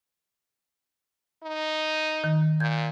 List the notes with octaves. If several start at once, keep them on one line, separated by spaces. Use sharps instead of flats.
D#4
D#3
A#2 G6 G#6